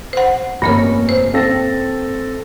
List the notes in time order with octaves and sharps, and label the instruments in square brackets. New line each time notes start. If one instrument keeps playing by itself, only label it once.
[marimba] C5 F#5
[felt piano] F1 C#4 [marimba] G2 A#3 A#4
[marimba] C5
[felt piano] C4 A4 A#6